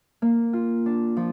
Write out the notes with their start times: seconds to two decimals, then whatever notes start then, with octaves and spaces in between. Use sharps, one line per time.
0.22 A#3
0.53 F4
0.86 D4
1.17 F3